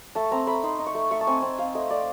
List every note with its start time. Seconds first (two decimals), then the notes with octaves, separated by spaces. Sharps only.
0.15 A3 A5
0.31 C4 A#5
0.47 A3 B5
0.63 D#4 C6
0.79 D#4
0.86 C#6
0.95 A3
1.11 A3 C#6
1.21 A5
1.27 C4 G#5
1.42 C4
1.58 C4 F5
1.75 A3 D#5
1.90 A3 D5